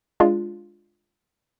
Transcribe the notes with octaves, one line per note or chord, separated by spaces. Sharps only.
G#3 D4 F4